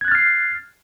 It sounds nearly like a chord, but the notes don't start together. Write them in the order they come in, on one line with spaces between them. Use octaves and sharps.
G#6 F#6 A6 F6 C7